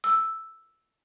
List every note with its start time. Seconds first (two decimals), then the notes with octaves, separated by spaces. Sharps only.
0.04 E6